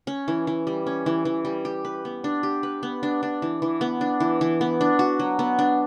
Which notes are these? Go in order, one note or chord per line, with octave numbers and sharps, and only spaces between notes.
C#4
E3
E3
G3
C#4
E3
E3
G3
G4
B4
B3
D4
G4
B4
B3
D4
D4
E3
E3
B3
D4
E3
E3
B3
D4
F#4
F#3
B3
D4